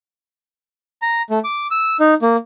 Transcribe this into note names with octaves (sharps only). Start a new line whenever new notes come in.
A#5
A3
D6
E6
D#4
A#3